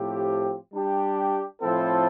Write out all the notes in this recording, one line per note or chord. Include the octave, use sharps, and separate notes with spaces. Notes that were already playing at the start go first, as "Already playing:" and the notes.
Already playing: A2 F3 C4 G4
G3 D4 G4
A2 F3 C4 E4 A4